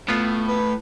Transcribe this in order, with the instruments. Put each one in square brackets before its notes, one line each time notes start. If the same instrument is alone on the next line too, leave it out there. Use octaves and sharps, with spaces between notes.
[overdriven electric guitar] A2 [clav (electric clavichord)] B3 F4
[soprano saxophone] B4